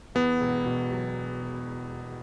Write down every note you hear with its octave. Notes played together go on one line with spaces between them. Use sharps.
E2 B3
E1
B2
F#3